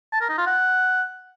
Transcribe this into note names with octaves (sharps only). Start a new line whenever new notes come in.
A5
A#4
D#4
F4
F#5